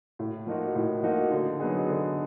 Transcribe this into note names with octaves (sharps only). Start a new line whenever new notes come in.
A2
F3 A#3 D#4 F#4
A2
F3 A#3 D#4 F#4
D3
F#3 B3 D#4 G#4
D3